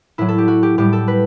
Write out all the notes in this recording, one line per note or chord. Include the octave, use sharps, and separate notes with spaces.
A2 F#3 E4
A4
G4
F#4
G4
A2 G3 G4
A4
B4